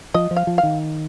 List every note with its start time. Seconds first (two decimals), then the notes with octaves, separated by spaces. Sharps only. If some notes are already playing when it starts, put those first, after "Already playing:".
0.14 F3 D#5
0.31 F3
0.36 F5
0.47 F3
0.58 F5
0.63 D#3